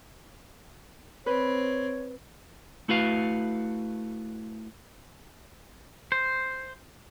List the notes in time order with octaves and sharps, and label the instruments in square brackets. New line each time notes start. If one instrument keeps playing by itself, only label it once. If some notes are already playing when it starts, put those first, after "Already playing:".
[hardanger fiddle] C4 [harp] B4 [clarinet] C#5
[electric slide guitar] A3 E4 F#4 B4 F5
[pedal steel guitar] C5